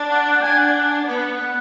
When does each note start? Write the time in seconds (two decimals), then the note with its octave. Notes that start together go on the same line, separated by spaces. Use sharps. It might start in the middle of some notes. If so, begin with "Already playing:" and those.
Already playing: D4
0.10 F#5
0.32 F#5
0.42 D4 G#5
0.58 F#5
1.05 B3
1.37 F#5